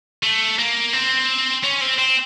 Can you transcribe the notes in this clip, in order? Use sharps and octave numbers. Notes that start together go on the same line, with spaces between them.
A3
A#3
C4
C#4
C4
C4